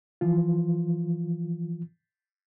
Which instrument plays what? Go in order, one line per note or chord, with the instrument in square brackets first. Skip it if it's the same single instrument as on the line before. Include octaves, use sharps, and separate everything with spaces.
[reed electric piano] E3 F3 F4